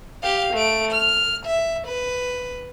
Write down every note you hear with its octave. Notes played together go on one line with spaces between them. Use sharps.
G4 F5
A3 D7
F6
E5
B4